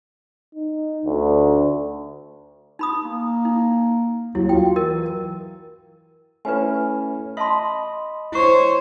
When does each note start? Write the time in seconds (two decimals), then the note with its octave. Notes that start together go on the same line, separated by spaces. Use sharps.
0.55 D#4
1.05 D2
2.79 D#4 B5 D#6
3.04 A#3
3.45 D#4
4.35 D#2 F#3 E4
4.49 F4 G5
4.76 E3 A#4 D#5
6.45 A3 C#4 E4 B4 G#5
7.37 D#5 E5 A5 B5 C6
8.32 E4 C5 C#5 C#6